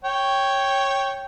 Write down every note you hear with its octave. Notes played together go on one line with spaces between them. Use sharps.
C#5 G5